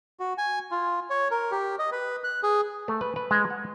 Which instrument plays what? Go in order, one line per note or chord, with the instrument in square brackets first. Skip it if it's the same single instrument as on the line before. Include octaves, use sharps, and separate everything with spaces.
[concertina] F#4
G#5
F4
C#5
A#4
G4
D#5
B4
F#6
G#4
[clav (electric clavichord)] A3
B4
B4
G#3
F#5